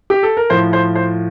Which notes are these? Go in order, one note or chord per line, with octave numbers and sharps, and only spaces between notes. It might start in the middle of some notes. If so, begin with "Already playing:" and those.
G4
A4
A#4
A2 F3 C5
C5
C5